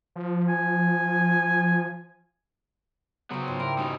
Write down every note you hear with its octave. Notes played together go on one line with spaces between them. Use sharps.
F3
G#5
C#3 F#3 B3 F#4 C5 G5
G#2 F4 C6 D7
G3 A#3 E4 A#4
B2 G3 C#4 D#4 B4